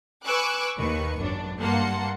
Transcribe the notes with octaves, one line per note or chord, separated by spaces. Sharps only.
B4 G#5 C#6 D6 E6 F#6
D#2 D#3 B4 C#6
G#1 F#2 D4
G2 A#3 F#5 A5 C6 C#7